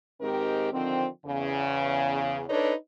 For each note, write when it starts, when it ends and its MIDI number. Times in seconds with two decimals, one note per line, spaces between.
0.22 0.71 44
0.22 0.71 51
0.22 0.71 56
0.22 0.71 60
0.22 0.71 67
0.22 0.71 70
0.73 1.07 50
0.73 1.07 51
0.73 1.07 53
0.73 1.07 60
1.26 2.44 40
1.26 2.44 49
2.49 2.73 62
2.49 2.73 63
2.49 2.73 69
2.49 2.73 71
2.49 2.73 73